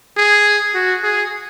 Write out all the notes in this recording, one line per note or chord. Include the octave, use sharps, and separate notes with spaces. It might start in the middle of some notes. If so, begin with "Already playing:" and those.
G#4
F#4
G#4